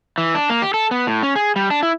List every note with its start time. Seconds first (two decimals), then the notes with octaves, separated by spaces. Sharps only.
0.18 E3
0.35 D4
0.50 A#3
0.62 G4
0.74 A4
0.91 B3
1.07 A2
1.23 C#4
1.36 G#4
1.56 G3
1.70 D4
1.83 E4